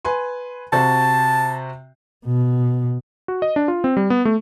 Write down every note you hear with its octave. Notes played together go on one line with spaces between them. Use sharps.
B4 G#5 C6
C3 F#4 C5 A5
B2
F#4
D#5
D4
F4
C4
G3
B3
A3